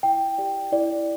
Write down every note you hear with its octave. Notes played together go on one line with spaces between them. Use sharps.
E4 G5
G4 D5
E4 D5